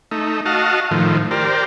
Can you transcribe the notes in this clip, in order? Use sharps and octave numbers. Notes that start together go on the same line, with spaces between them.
A3 D#4
F#4 D#5 F5 A5
A2 D#3 F3
G4 A#4 C5 D5